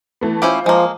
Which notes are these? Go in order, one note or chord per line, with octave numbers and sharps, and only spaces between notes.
E3 A3 B3
C#4 E4 F4 G4 C5
F3 G#3 A#3